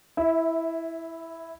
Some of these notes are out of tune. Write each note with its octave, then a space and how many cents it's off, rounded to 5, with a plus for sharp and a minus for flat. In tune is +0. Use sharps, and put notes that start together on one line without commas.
E4 +0 E5 -30